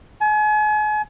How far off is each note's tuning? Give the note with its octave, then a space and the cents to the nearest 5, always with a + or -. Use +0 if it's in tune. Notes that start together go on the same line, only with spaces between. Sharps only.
G#5 +40